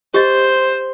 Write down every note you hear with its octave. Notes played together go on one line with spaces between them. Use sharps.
G4 C5 D#5